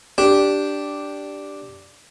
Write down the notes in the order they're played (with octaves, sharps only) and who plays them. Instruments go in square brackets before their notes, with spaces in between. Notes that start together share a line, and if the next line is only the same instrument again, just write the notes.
[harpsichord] D4 [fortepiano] G4